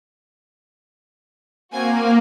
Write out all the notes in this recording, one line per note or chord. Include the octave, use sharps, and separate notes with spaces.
A#3 C4 F#4 G#5